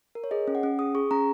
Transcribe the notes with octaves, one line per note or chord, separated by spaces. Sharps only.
A#4
C#5
G#4 D#5
C#4
F#5
C#4
G#4 D#6
G#4 C#6
C#4 A#5